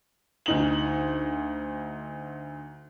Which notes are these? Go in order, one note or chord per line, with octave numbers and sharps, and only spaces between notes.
D2 D#4 F#7